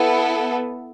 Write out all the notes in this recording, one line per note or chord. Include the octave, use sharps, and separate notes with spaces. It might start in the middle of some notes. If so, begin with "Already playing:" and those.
Already playing: B3 E4 A4